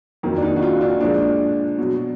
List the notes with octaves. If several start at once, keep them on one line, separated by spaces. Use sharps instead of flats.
F2 D#3 F#3 A#3
D4
D#4
F#4
F4
D4
A#2 F3 G#3 D4
B2 F#3